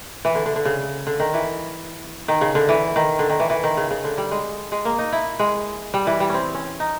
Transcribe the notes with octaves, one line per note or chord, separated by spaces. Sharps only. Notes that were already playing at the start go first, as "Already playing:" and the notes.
E3
D3
D3
D3
C#3
D3
D#3
E3
D#3
C#3
D3
E3
D#3
D3
D#3
E3
E3
D#3
C#3
C#3
D3
G3
G#3
G#3
A#3
D#4
E4
G#3
G3
E3
G3
C4 C#4
C#4
D#4